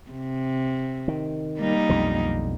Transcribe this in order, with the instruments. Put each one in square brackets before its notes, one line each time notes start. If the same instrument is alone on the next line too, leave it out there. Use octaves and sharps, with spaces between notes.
[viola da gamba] C3
[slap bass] D#3
[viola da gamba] G3 A#3 D#4
[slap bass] B1 F2 D3